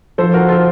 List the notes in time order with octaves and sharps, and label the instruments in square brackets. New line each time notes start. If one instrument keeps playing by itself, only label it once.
[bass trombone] F3 [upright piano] A4 C5
[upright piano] F#4 A#4
F4 A4